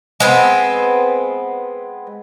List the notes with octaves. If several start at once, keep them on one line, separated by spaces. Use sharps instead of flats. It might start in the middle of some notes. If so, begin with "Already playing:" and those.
G#3 B3 C4